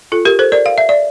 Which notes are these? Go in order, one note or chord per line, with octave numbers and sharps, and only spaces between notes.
F4 A4
G4 A#4
A4 C5
A#4 D5
F5
E5
D5